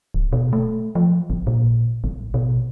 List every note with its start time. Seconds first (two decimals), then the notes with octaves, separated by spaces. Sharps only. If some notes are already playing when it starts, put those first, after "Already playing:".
0.14 D1
0.33 B2
0.53 A3
0.95 F3
1.30 A1
1.47 A#2
2.04 A1
2.34 B2